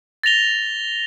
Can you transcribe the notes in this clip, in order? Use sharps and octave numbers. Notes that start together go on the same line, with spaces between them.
A6 A#6 F7 G7